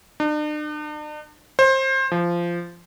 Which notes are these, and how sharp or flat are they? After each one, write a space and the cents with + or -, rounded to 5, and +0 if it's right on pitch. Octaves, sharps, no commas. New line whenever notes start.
D4 +45
C5 +25
F3 -15